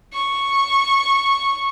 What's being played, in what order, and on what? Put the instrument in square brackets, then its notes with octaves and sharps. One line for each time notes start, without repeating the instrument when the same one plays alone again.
[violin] C#6